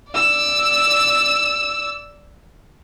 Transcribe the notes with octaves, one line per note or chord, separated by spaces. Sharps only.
D5 E6